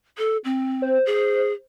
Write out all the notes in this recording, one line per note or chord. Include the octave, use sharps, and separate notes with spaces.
A4
C4
C5
G#4